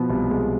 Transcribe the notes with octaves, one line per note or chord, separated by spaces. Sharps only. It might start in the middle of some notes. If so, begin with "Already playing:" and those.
Already playing: B2 F3 B3
C2
G#3